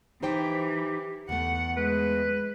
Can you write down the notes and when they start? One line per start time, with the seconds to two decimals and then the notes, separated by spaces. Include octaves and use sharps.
0.23 E3 D#4 G4 C5 G5
1.29 E2 A3 F#5
1.76 G#3 B4